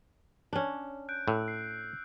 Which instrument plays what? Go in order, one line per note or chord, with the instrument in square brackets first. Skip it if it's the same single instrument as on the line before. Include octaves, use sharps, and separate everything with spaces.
[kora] C#4 D4
[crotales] F#6 G6 D7
[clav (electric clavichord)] A2 [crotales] E6
[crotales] C7